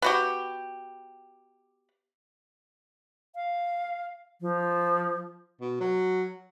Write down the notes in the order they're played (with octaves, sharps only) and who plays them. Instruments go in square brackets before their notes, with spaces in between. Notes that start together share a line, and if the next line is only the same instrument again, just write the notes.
[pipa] B3 F#4 G4
[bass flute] F5
F3
[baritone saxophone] B2
F#3